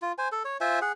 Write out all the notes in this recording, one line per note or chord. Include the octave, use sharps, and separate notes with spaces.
F4
C5 G#5
A4
C#5
F4 C5 E5 G#5
G#4 F#5